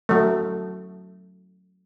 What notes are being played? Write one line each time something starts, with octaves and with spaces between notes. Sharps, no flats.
F#3 A3